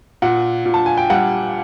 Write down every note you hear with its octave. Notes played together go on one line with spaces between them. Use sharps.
A#2 F#5
A#2
A5
G#5
G5
G3 F#5